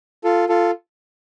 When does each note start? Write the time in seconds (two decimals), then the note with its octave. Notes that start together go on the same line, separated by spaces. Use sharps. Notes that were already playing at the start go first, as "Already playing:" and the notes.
0.24 F4 A4
0.49 F4 A4